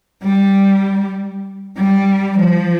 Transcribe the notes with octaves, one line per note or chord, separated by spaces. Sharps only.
G3
G3
F3